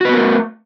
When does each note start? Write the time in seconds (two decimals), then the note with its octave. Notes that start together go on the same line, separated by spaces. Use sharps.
0.01 F#4
0.05 B4
0.09 B3
0.13 A#4
0.17 A3